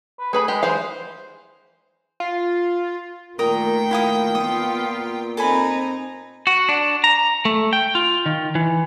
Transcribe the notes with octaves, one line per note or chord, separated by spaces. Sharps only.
B4
A3 G#4 B4 B5
G#3 G4
E3 G#4 C5 F5
F4
A#2 D#3 A3 A#4 G5 A#5 D#6
A#2 E4 F5 D#6
B3 F4 D#6
C4 D#4 A4 A#4 G#5 B5
F#4
D4
A#5
A3
G5
F4
D#3
E3